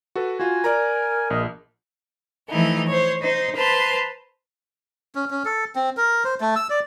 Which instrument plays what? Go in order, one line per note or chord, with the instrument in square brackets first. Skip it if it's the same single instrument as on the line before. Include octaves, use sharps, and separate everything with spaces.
[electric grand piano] F#4 A4 B4
[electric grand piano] F4 F#4 [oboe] G#5
[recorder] A#4 [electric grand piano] D5 A#5
[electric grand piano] A#1 [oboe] D#5
[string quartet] E3 F3 A3 D#4 E4
C5 C#5
D#4 C5
B4 C5 A5 A#5 C6
[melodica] C#4
C#4
A4
C4
A#4
C5
A3
E6
D5